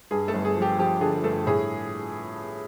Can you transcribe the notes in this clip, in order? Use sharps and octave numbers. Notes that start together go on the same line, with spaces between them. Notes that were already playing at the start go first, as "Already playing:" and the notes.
G2 G#4
A3 A4
G1
G#4
F3
G4
F3 G4
D3 G#4
G2 A3 A4
A2 G#4